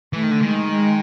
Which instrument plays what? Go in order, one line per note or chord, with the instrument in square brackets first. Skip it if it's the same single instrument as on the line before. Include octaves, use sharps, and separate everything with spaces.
[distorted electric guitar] E3 [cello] A3
[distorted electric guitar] D#3
D3
[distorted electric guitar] D#3 [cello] G#3
[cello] G#3